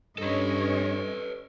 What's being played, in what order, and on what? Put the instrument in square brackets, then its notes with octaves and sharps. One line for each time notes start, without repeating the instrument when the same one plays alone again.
[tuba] G2 [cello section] C#4 C#5 D#5 [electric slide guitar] A4 B4